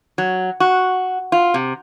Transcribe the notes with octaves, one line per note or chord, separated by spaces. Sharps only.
F#3
F#4
F4
C3